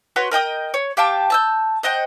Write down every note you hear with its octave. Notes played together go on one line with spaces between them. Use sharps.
F#4 B4 C#5 C6
A#4 D#5 G5 D#6
C#5
G4 F5 G5 A5
A5 E6 G6
C5 D#5 F#5 G5